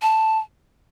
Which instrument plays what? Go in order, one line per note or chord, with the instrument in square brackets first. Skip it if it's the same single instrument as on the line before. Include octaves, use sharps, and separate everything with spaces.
[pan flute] A5